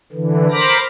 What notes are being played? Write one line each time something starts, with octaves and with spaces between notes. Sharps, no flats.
D3 E3
A#4 C5 A#5 B5 D6 A#6